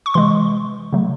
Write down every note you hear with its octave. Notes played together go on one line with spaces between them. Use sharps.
C#6
C3 E3 G#3 C6
C#3 F#3 A3